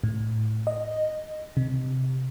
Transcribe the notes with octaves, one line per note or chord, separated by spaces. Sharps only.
A2
D#5
C3